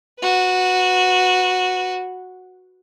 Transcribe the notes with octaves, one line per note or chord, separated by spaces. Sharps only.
F#4 B4